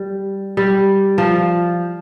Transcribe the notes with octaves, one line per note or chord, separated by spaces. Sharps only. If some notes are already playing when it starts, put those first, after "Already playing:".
Already playing: G3
G3
F3